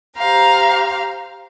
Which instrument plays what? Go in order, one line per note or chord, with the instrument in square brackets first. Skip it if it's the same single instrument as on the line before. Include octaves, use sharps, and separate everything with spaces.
[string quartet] G4 C5 F5 A#5